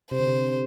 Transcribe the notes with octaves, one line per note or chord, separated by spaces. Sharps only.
C3 C5
D3
C3